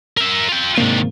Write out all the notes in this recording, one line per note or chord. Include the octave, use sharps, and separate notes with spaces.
A#4 E5
F4 G5
G#2 C3 D#3 A#3 D4